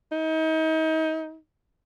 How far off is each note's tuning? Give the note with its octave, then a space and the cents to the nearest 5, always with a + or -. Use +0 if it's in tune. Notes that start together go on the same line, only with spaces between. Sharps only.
D#4 +35